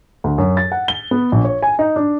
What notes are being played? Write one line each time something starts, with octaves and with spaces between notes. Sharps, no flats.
D2
F#2
A6
F#5
G7
B3
A#1
C#5
G#5
D#4
D4